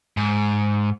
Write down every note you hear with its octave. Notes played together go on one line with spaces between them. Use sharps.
G#2